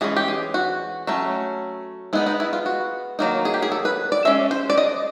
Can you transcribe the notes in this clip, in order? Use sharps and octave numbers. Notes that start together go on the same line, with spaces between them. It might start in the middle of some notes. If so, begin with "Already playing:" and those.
E3 G#3 C#4 G#4
G4
G#4
F#4
F#3 A3 C#4
G#3 B3 D#4 E4
D#4
E4
F4
F#4
D#3 F#3 A#3 D#4
G#4
G4
G#4
A4
B4
D5
G#3 C#4 E5
C5
D5
D#5